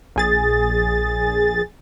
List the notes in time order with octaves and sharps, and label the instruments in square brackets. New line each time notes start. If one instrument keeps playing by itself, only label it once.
[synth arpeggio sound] A#1 G#4 A6